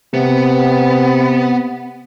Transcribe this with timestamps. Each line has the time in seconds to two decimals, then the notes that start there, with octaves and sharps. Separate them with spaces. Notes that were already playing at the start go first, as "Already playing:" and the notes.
0.14 C3 B3